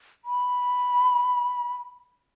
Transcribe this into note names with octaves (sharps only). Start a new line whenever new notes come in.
B5